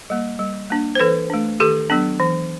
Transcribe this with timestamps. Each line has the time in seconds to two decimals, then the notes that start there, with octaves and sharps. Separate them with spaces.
0.10 G3 A#3
0.39 G3
0.70 A#3 D4
0.95 C5
0.99 E3 A4 B4
1.30 A3 D4
1.60 D#3 G4 A4
1.90 F#3 B3 D4
2.20 E3